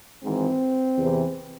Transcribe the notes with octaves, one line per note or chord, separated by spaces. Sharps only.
G#1 G#2 E3 C4
E2 C3 E3